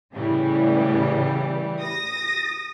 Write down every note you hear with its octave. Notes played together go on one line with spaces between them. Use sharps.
A2 C#3 E3 G3
D#6 A#6